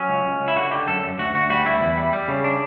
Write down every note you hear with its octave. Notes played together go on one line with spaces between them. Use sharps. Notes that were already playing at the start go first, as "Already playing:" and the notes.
Already playing: F#3 C#4
C#2
C#2
C#2
E4
D3 F#4
D3 G4
F#2 A4
F#2
D2 F#4
D2 F#4
G3 F#4
D2 E4
E2
G3
G3
C#3
D4